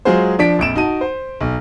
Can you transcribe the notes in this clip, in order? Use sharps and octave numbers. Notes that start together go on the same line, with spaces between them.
F#3 G#3 F4 G#4 C5
F3 D4 B6 D7
A#1 F2 D7 E7
D#4 F#4 A5 D#7
C5
B1